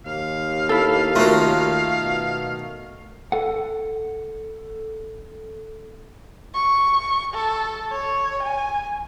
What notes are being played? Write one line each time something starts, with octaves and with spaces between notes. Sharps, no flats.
D#2 F5
E4 A4
D#3 A3 F4 F#4
B2
A4 F#5
C#6
A4
C#5
G#5